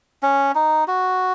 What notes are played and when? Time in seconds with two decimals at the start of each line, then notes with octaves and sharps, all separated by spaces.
0.23 C#4
0.55 D#4
0.88 F#4